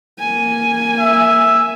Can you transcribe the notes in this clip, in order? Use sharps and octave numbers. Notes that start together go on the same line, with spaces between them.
A#3 G#5
E5